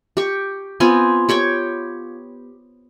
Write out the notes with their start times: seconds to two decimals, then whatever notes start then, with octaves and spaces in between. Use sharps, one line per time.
0.17 G4 C#6
0.80 B3 C4 F4 G#5
1.29 G4 C#5 G5 C#6